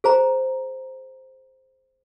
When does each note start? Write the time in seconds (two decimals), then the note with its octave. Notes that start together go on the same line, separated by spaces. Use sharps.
0.04 G#4 C5 A#5